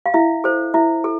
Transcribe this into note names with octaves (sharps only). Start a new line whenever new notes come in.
F5
E4 E5
A4 C5
E4 E5
A4